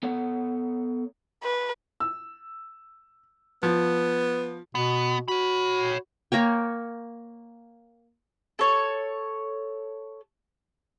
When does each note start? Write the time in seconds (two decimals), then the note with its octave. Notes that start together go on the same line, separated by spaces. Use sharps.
0.03 B3 A4 C#5 F#5
1.43 B4
2.00 E6
3.63 F3 B3
4.75 B2 B3
5.28 F#4 C#5 B5
6.32 A#3 A#4 C#5 G5
8.59 A4 C#5